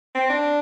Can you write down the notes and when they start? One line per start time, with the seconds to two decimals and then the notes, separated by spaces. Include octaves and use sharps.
0.15 C4
0.29 D4